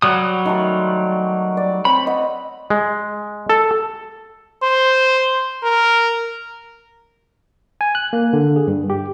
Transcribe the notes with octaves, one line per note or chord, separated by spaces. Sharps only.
F#3 G3 D#6
D#3 A3 C6
D5
C4 C#5 B5
D#5 F#5
G#3
A4
C5
A#4
G#5
F#6
A#3
D3
G#4
G2
G4